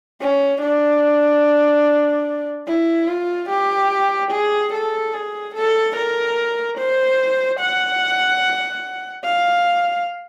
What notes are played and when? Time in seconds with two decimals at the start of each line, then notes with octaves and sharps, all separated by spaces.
0.21 C#4
0.61 D4
2.67 E4
3.08 F4
3.49 G4
4.32 G#4
4.73 A4
5.14 G#4
5.55 A4
5.96 A#4
6.78 C5
7.60 F#5
9.24 F5